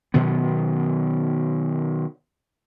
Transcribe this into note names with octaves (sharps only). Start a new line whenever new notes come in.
B2 D#3 F#3 B3